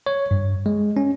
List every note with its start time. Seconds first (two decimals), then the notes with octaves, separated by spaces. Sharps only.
0.06 C#5
0.31 G2
0.66 G#3
0.97 C#4